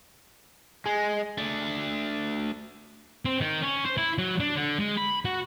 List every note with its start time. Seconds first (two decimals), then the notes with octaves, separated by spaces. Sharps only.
0.86 G#3
1.38 A3 D4
3.25 C4
3.41 D#3
3.62 C#4
3.85 C5
3.97 E4
4.18 F#3
4.40 D4
4.55 D3
4.80 G#3
4.97 B5
5.25 F#4